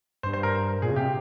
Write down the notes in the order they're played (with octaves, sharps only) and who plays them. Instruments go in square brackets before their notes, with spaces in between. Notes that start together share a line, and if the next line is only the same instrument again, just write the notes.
[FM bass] G2 [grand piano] C5
[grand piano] C5
A#4
[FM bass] A#2 [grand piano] G#4
[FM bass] C#3
[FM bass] C3 [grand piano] G4